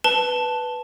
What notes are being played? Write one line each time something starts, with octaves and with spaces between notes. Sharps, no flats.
B4 A5 G7